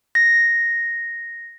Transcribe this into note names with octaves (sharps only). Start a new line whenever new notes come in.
A#6